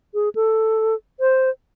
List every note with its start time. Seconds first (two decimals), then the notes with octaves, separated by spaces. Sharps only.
0.14 G#4
0.35 A4
1.20 C5